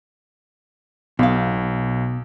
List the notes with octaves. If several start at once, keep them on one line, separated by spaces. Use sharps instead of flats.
B1 B2 F5